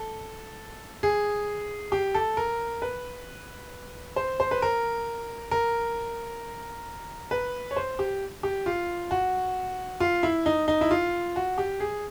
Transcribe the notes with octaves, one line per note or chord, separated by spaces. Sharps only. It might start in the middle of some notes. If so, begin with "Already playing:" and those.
Already playing: A4
G#4
G4
A4
A#4
B4
C5
C5
B4
A#4
A#4
B4
C#5
C5
G4
G4
F4
F#4
F4
E4
D#4
D#4
E4
F4
F#4
G4
G#4